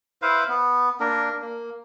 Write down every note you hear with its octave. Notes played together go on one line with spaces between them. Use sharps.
E4 B4 C5 F5
B3
A#3 D4 A#4
A#3